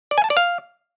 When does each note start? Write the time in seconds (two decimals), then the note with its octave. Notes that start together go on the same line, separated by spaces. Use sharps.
0.11 D5
0.18 G#5
0.24 A5
0.30 D5
0.37 F5